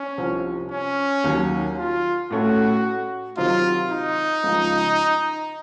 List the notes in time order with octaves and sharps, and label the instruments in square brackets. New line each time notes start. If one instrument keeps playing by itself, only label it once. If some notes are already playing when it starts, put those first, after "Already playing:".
Already playing: [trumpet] C#4
[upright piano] C2 C3 F3 C4
[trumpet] C#4
[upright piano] D#2 D#3 F#3
[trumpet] F4
[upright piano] A2 A3 C#4 [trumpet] F#4
[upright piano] C3 D#3 F#3 C4 D#4 [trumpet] F4
[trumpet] D#4
[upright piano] C#2 C#3 F3